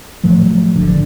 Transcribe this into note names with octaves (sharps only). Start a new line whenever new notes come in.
A2 F3 F#3 A3
G#1 D3